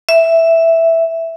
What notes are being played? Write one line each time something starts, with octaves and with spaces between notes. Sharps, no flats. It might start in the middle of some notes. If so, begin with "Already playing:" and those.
E5